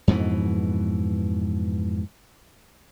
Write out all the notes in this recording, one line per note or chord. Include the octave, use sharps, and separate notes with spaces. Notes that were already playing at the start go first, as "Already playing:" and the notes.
F2 G#2 B2 E3